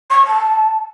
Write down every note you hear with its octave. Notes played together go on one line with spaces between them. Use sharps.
C#6
A5